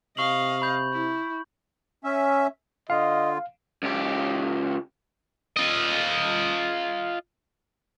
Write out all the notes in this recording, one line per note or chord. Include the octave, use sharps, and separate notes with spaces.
C3 D#5 F5 C#6 F#7
B5 G6
E4
C#4 E5
D3 F4 D#5 F5
C#2 G4
F4 D#5